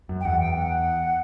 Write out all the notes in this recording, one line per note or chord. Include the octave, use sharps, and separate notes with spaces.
F#2
G5
E2 F#5
G5
F#5